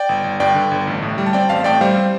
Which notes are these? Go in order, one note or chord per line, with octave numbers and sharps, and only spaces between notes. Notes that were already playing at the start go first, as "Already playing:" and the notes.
Already playing: D5 G5
G1
G1
G2 D5 G5
D3
G1
A1
A2
G3
A5
C4 D5 G5
A1 F5 A5
A2 D5 G5
G3 C5 F5
C4